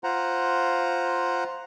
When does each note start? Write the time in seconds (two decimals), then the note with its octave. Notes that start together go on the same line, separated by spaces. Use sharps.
0.04 F4 C5 F#5 A#5